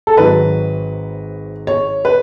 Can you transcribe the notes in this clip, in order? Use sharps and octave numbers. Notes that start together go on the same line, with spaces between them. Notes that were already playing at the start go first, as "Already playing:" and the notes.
A4
G#1 G#2 F#3 B4
C#5
B4